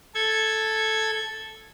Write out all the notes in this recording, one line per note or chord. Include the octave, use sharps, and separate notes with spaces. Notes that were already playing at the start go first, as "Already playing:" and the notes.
A4 G#6